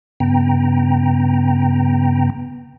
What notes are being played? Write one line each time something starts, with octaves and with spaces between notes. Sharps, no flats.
G2 C#3 B3 G5 A#5